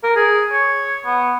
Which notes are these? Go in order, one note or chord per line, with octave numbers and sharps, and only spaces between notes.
A#4
G#4
C#5
B3